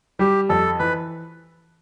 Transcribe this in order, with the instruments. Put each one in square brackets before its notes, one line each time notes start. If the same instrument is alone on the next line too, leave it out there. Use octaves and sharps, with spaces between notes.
[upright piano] G3 [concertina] G4
[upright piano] F2 [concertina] A4
[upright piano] E3 [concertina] B4